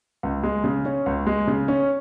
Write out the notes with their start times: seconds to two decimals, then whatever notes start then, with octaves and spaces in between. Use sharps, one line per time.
0.23 C#2
0.43 G#3
0.64 C#3
0.85 C#4
1.06 C#2
1.27 G#3
1.47 C#3
1.68 C#4